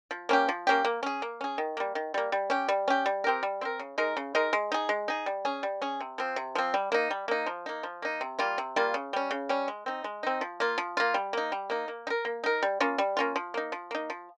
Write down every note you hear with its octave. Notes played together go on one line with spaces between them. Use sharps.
F3
A#3 C#4 G4
F3
A#3 C#4 G4
A#3
C#4 G#4
A#3
C#4 G#4
D#3
G3 A#3
D#3
G3 A#3
G3
C#4 G4
G3
C#4 G4
G3
C4 G4 A#4
G3
C4 G4 A#4
C#3
G#3 D#4 A#4
C#3
G#3 D#4 A#4
G#3
D#4 G#4
G#3
D#4 G#4
G3
C#4 G#4
G3
C#4 G#4
C3
F3 C4
C3
F3 C4
G3
A#3 D#4
G3
A#3 D#4
F3
A#3 D#4
F3
A#3 D#4
C3
G3 A#3 F4
C3
G3 A#3 F4
C#3
G3 C#4
C#3
G3 C#4
G#3
C4 D#4
G#3
C4 D#4
F3
A#3 F4
F3
A#3 F4
G3
A#3 D#4
G3
A#3 D#4
A#3
D#4
A#4
A#3
D#4 A#4
G3
A#3 C#4 F4
G3
A#3 C#4 F4
F3
A#3 D#4
F3
A#3 D#4
F3